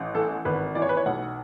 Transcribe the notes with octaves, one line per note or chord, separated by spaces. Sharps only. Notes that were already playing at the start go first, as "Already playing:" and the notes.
Already playing: A1
E3 A4
G#1 B4
E3 D5
C#5
B4
C#5
B1 F#5